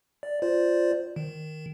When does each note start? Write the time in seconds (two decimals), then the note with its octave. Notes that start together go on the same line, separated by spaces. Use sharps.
0.23 D5
0.42 F4 C5 D5
1.16 D#3